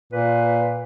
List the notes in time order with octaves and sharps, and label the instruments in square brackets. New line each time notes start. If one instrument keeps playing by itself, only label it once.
[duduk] A#2 [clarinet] B4